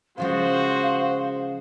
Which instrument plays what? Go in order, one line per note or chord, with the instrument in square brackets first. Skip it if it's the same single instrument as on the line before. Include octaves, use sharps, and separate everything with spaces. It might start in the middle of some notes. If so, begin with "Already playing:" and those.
[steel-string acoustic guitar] C#3 F3 G#3 [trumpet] F#4 [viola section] C5 [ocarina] F5